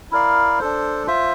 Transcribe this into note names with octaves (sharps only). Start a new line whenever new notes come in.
E4 A#4 D5 F5
D4 A4 C5
F4 C5 E5